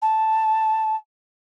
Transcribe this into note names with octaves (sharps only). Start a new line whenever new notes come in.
A5